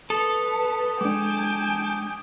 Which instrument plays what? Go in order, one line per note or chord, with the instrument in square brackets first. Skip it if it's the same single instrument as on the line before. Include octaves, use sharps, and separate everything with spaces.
[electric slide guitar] A4 [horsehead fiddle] B4 [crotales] D#6
[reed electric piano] G#3 D4 [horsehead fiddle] G5 G#5 [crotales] D6